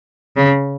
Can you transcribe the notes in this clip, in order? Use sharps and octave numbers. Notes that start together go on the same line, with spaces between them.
C#3